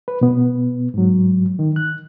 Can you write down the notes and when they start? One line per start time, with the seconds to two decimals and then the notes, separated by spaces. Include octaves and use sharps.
0.08 B4
0.21 B2 B3
0.94 G#2 F#3
1.59 D#3
1.76 F#6